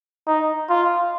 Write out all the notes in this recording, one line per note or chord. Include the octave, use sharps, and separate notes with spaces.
D#4
F4